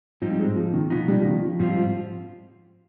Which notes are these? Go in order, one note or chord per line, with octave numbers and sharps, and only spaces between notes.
G#2 F3 G3 C4 D#4
G#3
F3
D#3
B2 F3 B3 D#4
G3
F3
D#3
F3
G#2 F3 G3 C4 F4
F3